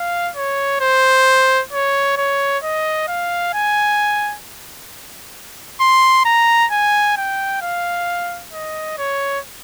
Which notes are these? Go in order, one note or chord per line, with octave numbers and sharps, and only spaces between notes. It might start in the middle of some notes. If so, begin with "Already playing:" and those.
Already playing: F5
C#5
C5
C#5
C#5
D#5
F5
G#5
C6
A#5
G#5
G5
F5
D#5
C#5